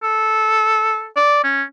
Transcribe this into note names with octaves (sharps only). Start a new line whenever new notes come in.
A4
D5
C#4